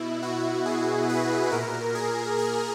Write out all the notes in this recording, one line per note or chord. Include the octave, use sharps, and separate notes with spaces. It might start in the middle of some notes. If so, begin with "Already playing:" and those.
Already playing: B2 E4
F#4
G#4
B4
A#2 A#4
G#4
G#4